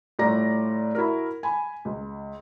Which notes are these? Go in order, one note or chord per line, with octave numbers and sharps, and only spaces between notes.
A2 G3 F4 D5 A#5 A#6
E4 F#4 A#4
G#5 B5
C#2